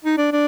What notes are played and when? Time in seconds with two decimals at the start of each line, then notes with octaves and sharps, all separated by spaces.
0.05 D#4
0.18 D4
0.32 D4